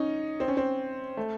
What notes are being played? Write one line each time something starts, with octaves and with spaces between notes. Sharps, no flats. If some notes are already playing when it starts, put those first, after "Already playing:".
Already playing: C#4 D#4
C4
C#4
C4
A3